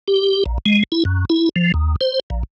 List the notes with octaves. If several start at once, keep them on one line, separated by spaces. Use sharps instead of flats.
G4
A#1
G#3
E4
F#2
E4
F3
D#2
C5
A#1